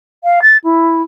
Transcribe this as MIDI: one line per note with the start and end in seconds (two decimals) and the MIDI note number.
0.24 0.39 77
0.42 0.57 93
0.63 1.02 64